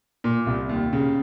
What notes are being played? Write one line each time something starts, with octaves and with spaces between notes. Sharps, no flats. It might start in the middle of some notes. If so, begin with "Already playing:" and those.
A#2
C2
D#2
C#3